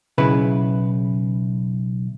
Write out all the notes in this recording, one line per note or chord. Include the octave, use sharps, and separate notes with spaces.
B1 C#3 B3 E4 B4